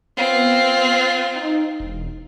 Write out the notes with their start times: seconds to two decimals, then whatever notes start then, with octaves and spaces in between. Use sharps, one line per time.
0.17 B3 C4 F4
1.35 D#4
1.80 E1